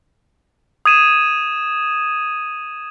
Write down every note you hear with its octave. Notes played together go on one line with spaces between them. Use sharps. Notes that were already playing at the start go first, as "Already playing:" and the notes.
D#6 G#6 D#7 E7